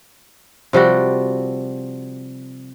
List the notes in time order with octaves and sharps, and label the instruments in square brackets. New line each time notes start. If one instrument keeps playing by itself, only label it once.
[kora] C3 F3 G3 F#4